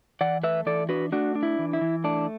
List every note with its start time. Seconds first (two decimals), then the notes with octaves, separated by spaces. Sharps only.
0.21 E3 D5 F#5
0.44 A3 B4 E5
0.66 E3 A4 D5
0.89 D4 F#4 B4
1.12 A3 D4 F#4
1.35 D4
1.43 E4
1.59 E3
1.73 E4
1.81 E3
2.04 A3 D4